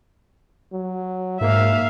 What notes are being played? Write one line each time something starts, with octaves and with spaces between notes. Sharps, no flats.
F#3
G#2 A#3 E5 F5